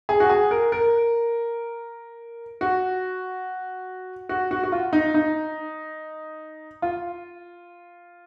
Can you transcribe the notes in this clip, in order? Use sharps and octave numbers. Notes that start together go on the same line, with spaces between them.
G#4
F#4
G#4
A#4
A#4
F#4
F#4
F#4
F#4
F4
D#4
D#4
F4